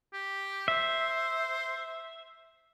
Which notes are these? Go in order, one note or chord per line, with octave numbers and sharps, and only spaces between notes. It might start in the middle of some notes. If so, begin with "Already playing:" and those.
G4
C5 E5